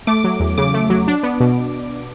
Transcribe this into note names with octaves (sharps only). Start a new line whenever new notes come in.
A3 D6
F#3
E2
C#3 D6
A3
F#3
D4
B3
B2